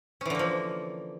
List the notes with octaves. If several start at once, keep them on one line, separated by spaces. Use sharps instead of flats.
D3 E3 F3 A#3 C#4